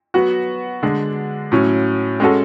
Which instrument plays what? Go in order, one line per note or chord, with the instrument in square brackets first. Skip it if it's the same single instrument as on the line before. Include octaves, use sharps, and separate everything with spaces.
[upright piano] F#3 B3 F#4 B4
D3 G#3 D4
A2 F#3 C#4
G#3 C#4 F#4 A4